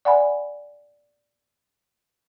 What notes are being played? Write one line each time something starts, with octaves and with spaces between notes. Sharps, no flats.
D5 F#5 G#5 B5